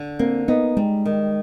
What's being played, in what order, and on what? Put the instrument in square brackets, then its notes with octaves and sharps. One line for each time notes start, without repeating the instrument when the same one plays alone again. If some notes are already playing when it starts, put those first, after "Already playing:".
Already playing: [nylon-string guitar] D3
[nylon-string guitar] A#3 [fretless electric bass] C4
[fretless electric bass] B3 [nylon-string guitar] D#4
[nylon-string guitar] G3 [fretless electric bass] G#3
[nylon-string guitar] D#3